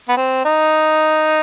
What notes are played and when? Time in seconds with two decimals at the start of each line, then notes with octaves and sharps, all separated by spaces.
0.09 B3
0.17 C4
0.45 D#4